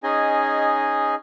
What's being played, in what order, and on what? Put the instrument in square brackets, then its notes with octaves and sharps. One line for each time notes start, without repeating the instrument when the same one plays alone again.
[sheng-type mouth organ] C#4 D#4 G#4 D#5 G#5